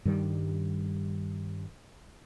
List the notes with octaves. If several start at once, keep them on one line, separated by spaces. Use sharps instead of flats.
G2 D#3 G3